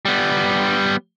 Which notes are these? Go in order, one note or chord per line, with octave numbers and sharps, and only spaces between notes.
G3 B3